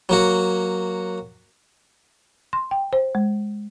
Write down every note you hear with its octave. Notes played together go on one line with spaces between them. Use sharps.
F#3 A#3 F#4
C6
G5
C5
G#3